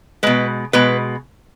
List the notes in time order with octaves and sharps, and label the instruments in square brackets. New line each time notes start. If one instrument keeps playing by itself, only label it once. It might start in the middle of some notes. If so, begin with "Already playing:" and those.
[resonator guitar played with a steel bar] B2 G#3 B4
B2 G#3 B4